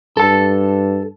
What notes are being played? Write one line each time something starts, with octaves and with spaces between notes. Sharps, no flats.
G2 A4 A5